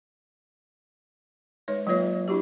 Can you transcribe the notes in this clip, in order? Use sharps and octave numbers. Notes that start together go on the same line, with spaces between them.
G#3 D#4 B4 C#5
F#3 A#3 F4 B4 C#5 E5
D4 E4 F#4 G4